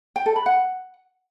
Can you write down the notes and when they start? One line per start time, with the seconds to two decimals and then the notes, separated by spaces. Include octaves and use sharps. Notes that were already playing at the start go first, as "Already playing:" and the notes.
0.16 G5
0.26 A4
0.36 B5
0.46 F#5